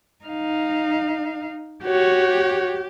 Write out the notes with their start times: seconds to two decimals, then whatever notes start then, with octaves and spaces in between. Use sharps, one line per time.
0.25 D#4 F5
1.85 F#4 G4 C#5